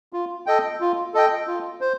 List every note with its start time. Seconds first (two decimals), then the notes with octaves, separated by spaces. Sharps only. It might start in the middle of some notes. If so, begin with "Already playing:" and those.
0.13 F4
0.46 A4 D#5 G5
0.80 F4
1.14 A4 D#5 G5
1.47 F4
1.81 C5